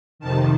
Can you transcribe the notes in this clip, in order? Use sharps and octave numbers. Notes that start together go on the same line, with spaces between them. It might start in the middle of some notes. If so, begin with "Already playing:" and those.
F2 C3 D#3 A5